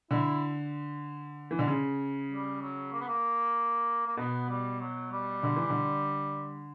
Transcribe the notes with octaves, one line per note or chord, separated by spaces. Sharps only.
D3 E4
E3
D3
C#3
G3
F#3
A#3
B3
A#3
A#3
B2 B3
G3
F#3
G3
D3
E3
D3